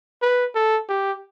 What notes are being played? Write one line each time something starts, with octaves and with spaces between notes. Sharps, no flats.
B4
A4
G4